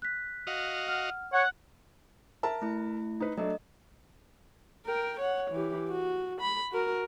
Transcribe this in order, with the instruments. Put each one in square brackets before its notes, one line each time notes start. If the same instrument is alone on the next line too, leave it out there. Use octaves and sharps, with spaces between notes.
[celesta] F#6 B6
[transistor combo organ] F#4 D#5 F5
[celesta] F#5 F6
[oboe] C#5 [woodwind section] F#5
[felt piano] A#4 E5 A5
[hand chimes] A3 E4
[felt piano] D#4 B4
[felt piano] F#3 A3 D4 [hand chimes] D#5
[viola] A#4 G5
C#5 F#5
E3 G4
F#4
B5
F#4 A#4